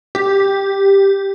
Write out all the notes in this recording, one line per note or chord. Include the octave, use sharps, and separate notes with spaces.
G4